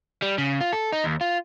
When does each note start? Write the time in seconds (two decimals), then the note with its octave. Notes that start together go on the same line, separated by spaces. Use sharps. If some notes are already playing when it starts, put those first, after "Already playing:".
0.22 G3
0.38 C#3
0.60 F4
0.73 A4
0.92 D#4
1.04 D#2
1.21 F4